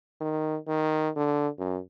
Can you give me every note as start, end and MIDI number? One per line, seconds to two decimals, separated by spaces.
0.21 0.57 51
0.67 1.09 51
1.16 1.48 50
1.59 1.79 42